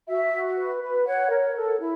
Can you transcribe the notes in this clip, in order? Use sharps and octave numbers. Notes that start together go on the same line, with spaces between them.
F#4 E5
F#4
B4
B4
C#5 F#5
A#4
A4
E4